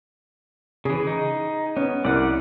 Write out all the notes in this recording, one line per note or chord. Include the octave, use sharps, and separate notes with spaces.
C#3 E3 G#4
D#4
B3 C#4
C2 D5 F#5